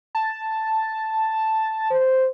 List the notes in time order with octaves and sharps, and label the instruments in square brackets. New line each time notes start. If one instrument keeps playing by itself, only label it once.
[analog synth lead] A5
[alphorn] C5